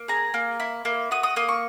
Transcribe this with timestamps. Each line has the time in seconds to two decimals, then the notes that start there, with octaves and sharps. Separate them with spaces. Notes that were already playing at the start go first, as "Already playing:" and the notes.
Already playing: A#3
0.08 G#4 A#5
0.34 A#3
0.60 E4
0.85 A#3
1.11 F#4 D#6
1.23 D#6
1.36 A#3 D#6
1.49 C#6